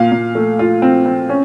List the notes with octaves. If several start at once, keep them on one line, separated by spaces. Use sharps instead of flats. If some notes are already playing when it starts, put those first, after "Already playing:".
Already playing: A#2 F5
A#2
A3
F4
C4
C4
C#4